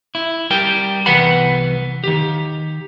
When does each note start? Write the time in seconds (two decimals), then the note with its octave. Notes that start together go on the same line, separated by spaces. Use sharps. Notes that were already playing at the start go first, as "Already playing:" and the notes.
0.15 E4
0.51 G3 A#4 G5
1.06 C2 E3 B3 B4 F#5 B5
2.04 D#3 G4